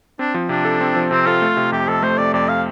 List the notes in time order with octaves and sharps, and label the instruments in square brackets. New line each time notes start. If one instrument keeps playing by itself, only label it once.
[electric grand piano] C4 [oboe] D4
[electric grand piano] F3
[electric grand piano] C3 [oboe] D4
[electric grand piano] A4
C4
F3
[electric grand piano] C3 [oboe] C4
[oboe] F4 [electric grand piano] A4
[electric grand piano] A3
C3
[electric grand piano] F2 [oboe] G4
[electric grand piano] F2 [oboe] A4
[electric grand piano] A3 [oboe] C5
[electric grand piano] C3 [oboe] D5
[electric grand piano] F2 [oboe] D5
[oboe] F5